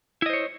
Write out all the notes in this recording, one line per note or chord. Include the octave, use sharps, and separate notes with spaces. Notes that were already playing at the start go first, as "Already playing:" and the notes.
E4 C5 C#5 D#5